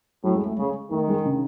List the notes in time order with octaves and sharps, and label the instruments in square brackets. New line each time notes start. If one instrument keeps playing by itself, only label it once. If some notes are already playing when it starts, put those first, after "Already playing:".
[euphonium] A2 [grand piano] F#3
[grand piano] G#3
A3
[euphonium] C#3 [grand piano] G#3
[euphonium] D#3 [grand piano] A3
[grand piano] G#3
C#3